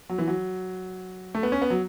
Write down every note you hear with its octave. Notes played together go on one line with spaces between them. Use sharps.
F#3
E3
F#3
A3
B3
C#4
B3
F#3